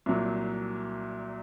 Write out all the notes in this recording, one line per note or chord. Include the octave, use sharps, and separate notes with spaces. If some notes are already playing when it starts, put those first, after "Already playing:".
C2 A#2 F#3